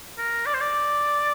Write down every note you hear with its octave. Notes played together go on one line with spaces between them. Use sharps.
A#4
D5
C5
D5